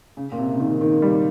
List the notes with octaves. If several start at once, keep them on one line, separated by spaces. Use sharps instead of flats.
C#3
A#2
C3
C#3
D#3
D#3
G3